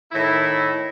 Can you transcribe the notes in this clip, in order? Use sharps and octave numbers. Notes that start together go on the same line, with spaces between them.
A2 D#3 E4